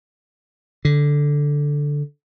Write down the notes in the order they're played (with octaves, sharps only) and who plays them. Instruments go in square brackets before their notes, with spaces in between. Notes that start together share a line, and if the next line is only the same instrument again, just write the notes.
[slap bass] D3